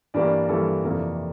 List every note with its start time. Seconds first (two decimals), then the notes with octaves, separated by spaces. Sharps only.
0.14 G2 E3 G3 A#3 D4 D5
0.49 G2 E3 G3 A#3 A4
0.84 F2 C3 E3 A#3 D4